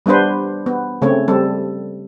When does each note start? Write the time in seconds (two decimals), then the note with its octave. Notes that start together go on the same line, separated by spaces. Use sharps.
0.06 G3 B3 D4 B4 C5
0.66 B3
1.02 C#3 A3 C4 C#5
1.28 G3 C4 A4